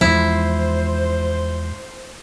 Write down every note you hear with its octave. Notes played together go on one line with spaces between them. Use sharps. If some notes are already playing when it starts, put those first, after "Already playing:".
E2 G#2 F3 E4 C5